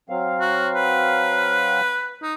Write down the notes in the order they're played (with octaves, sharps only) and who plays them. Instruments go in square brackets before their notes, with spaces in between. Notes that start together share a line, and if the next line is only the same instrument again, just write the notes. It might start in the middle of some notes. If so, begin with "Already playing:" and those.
[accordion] F#3 C4 F5
[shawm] F#4
B4
D#4